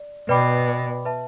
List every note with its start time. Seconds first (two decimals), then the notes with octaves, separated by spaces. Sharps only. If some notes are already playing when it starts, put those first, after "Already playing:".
Already playing: D5
0.29 B2 B4 D5 G5 B5 D6
1.05 B4 E5 A5